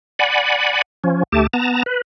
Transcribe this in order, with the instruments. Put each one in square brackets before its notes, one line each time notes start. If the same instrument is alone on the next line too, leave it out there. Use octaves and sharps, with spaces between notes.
[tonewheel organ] D5 F#5 G#5 B5
F3 C#4
D2 A3 G4 A5
B3 A5 A#5
B4